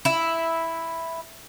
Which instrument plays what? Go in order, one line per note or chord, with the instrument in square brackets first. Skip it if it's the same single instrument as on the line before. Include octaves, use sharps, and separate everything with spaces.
[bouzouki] E4